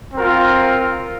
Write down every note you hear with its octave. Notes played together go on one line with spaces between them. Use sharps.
C4 F4 A#4